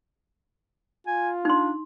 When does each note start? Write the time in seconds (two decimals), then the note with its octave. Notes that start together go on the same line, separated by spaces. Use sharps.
1.07 F4 G#5
1.45 D4 D#4 C6